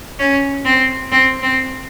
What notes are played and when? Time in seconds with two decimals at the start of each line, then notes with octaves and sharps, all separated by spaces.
0.19 C#4
0.65 C4
1.12 C4
1.42 C4